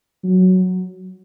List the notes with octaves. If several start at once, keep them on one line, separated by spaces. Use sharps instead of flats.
F#3